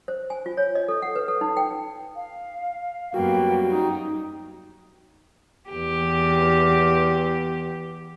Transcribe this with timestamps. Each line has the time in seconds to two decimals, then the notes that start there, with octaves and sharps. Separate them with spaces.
0.08 C5
0.30 G#5
0.46 F4
0.57 C#5
0.75 D#5
0.88 A4
1.02 F#5
1.15 B4
1.28 A4
1.41 D#4
1.57 G5
2.16 F5
3.14 F#2 G3 A#3 B3 F#4 G5
3.70 D#4
5.70 E2 G4